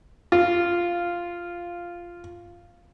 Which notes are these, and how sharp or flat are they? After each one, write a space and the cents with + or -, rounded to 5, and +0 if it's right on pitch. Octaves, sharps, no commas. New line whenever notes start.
F4 -5